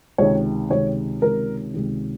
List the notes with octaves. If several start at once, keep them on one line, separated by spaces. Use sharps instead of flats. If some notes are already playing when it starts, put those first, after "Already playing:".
C#2 C3 D#3 C#5
C#2 C3 D#3 C#5
C#2 C3 D#3 A#4
C#2 C3 D#3